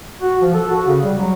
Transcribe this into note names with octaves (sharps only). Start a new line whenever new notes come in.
F#4
F3
A4
F#4
C#3
G3
F#3